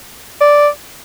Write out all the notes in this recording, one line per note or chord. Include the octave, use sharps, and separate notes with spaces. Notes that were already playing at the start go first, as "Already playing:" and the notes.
D5